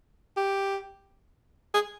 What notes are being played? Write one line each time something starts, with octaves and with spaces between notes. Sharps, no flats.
G4
G#4